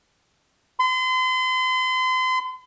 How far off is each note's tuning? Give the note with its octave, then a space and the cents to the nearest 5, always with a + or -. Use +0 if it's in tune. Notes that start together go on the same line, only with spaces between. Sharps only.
C6 -35